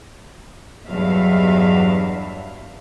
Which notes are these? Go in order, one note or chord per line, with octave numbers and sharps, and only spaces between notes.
E2 G2 B2 F#3 E5 F5